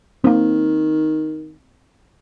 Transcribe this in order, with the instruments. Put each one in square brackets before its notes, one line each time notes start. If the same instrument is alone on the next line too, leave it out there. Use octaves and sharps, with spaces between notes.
[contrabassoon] D#3 [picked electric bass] A#3 C4